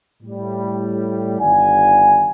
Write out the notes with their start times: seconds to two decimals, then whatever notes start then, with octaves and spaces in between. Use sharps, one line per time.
0.23 A2 G3
1.40 G1 D#3 D5 F#5 G#5